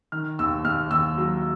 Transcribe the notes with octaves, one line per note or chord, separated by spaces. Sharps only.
D#3 F6
D#2 E6
D#2 F6
D#2 E6
F#3